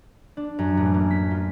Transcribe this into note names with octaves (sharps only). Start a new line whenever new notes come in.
D4
F#2
A1
A#3
B6
F4